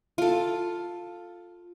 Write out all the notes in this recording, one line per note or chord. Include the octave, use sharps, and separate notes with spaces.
F4 A4